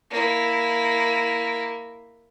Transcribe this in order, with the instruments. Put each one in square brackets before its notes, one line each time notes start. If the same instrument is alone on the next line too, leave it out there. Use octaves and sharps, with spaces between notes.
[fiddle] A#3 E4